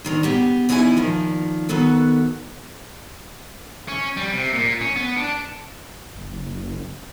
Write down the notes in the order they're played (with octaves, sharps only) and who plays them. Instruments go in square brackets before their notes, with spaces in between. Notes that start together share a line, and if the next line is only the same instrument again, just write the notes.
[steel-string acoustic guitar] D2 D#3 A#5
B3 G4 G#4
E2 B3 D#4 E4 F#4 G#5
A#2 D#3 F3
D#3 B3 F#4 A4 B4
[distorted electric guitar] C#4
G3
C3
A#2
C#4
B3
D4
[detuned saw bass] F#1